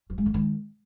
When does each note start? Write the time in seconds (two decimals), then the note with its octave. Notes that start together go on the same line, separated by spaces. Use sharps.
0.10 F3
0.18 G#3
0.26 D3
0.34 D#3